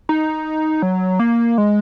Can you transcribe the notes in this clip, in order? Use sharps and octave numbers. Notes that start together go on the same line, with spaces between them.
D#4
F#3
A#3
G#3